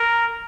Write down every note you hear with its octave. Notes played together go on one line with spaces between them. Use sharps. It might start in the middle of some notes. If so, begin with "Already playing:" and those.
Already playing: A#4